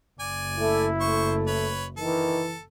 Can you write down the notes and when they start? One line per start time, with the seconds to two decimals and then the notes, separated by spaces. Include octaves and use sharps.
0.20 F#1 D5 G#5
0.57 A3 E4
1.00 A3 C5 C#6
1.47 B4 C#5
1.97 D#3 E3 A4